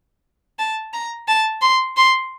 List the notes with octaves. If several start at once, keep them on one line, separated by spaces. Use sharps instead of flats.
A5
A#5
A5
C6
C6